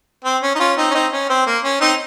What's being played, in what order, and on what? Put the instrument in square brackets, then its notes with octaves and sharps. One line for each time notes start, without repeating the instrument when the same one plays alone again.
[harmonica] C4
C#4
D#4
C#4 F4
C4 D#4
C#4
C4 D#4
C#4
C4
A#3
C#4
C4 D#4